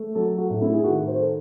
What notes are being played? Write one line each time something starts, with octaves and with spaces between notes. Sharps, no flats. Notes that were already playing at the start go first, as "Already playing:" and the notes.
Already playing: A3
F#3 A4
F#4
A2
E4
G#4
D#3 F#4
C5
A4